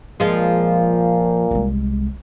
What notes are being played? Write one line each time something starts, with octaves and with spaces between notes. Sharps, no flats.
A#2 F3 G#3
C2 G#3